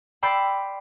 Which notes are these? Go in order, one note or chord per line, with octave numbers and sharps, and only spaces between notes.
D5 G5 B5 C6 E6